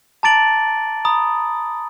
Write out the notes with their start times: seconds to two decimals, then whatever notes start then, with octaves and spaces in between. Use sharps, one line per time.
0.23 A5 A#5 D6 A6 D7 F#7
1.05 A#5 B5 D#6